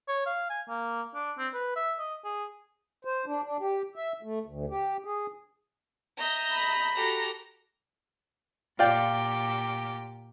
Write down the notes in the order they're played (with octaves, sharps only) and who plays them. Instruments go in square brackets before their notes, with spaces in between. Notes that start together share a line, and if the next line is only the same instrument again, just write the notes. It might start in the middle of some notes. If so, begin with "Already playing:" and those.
[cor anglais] C#5
F5
G#5
A#3
D4
C4
B4
E5
D#5
G#4
[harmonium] C5
D4
D4
G4
E5
A3
D2
G4
G#4
[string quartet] D#5 E5 [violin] A#5 G6
[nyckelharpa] B5
[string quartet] F#4 G4 A4 [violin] A#5
[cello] A#2 G4 [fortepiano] F4 D5 G5